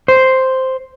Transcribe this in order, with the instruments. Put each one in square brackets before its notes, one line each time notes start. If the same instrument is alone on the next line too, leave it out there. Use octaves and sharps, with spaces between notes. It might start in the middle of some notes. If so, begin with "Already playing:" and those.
[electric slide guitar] C5